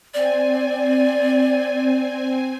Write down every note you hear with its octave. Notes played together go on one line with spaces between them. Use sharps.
C4 D5 G#5